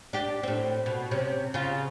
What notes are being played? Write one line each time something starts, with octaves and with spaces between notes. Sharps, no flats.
D4 G4
A2 C4
B2
C3 C#4
C#3 F4